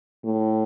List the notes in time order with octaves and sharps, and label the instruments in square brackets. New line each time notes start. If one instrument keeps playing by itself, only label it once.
[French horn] A2